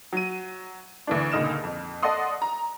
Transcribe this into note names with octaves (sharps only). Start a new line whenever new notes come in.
F#3 D#7
D2 E3 D4
C#2 A#2 D3 D#4 F6 E7
F2
A4 D5 D#5 F#5 C6 D#6
A#5